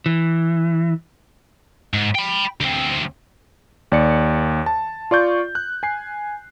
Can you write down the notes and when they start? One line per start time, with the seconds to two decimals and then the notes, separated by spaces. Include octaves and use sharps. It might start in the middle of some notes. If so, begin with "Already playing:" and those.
0.06 E3
1.94 G#2
2.15 G5 B5
2.60 D2 C4
3.92 D#2 D5 C#7
4.66 A5
5.11 F4 D5 C#6 G6
5.55 F#6
5.83 G#5 C7